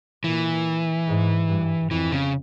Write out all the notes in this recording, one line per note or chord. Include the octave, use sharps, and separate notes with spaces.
A#2 E3
G#2
G2
F2 E3
C#3